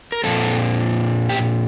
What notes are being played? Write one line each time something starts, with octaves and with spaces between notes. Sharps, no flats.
A#4
A#2 F3 C4 A4
G4